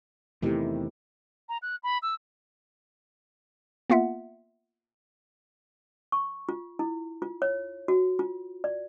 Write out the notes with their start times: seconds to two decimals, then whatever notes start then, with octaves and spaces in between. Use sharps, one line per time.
0.42 E2 C3 D#3 A3 E4 G4
1.49 A#5
1.62 F#6
1.83 B5
2.02 E6
3.90 A#3 B3 F4 E5 F#5
6.12 C#6
6.49 F4
6.79 E4
7.22 F4
7.42 C#5
7.88 F#4
8.19 F4
8.64 D5